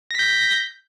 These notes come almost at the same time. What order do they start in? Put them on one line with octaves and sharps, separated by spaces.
A#6 B6 G6